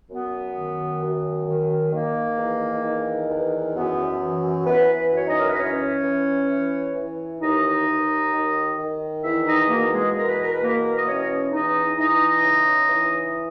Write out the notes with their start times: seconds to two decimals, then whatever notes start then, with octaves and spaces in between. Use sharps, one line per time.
0.09 F#2 B3
0.56 D#3
1.01 F#2
1.47 D#3
1.93 D#3 A#3
2.38 E2
2.83 D#3
3.29 E2
3.74 F#2 B3
4.21 E3
4.66 E3 B3 B4
5.12 F#2 C#5
5.27 D#4 D#5
5.39 A#4
5.48 B4
5.57 E3 C#4 C#5
6.03 E3
6.49 E3
6.95 E3
7.40 D#2 D#4 D#5
7.87 D#2
8.32 D#3
8.77 D#3
9.23 E2 E4 E5
9.46 D#4 D#5
9.69 B2 A#3 A#4
9.92 G#3 G#4
10.15 E2 A#4
10.26 B4
10.39 A#4
10.50 B4
10.61 B2 A#3 A#4
10.96 D#5
11.06 E3 C#4 C#5
11.52 E2 D#4 D#5
11.98 E3 D#4 D#5
12.43 C#3
12.89 E3